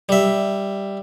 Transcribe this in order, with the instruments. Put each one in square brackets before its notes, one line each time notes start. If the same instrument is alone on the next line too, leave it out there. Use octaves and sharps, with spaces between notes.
[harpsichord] G3 E5